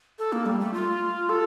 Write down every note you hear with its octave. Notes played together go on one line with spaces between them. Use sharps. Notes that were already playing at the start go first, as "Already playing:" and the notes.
A4
A#3
G3
A3
F4
A4